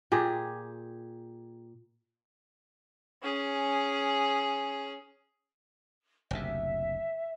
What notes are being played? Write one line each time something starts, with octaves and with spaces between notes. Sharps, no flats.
A#2 G4 G#4
C#4 G#4
F#1 D2 C3 E5